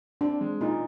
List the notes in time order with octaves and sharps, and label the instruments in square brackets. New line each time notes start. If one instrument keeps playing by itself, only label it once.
[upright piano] C4 [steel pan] D4
[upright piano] G#3
[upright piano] A#2 [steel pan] D#4